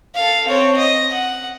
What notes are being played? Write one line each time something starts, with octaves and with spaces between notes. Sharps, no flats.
A4 F5
C4 C#5
D#5
F#5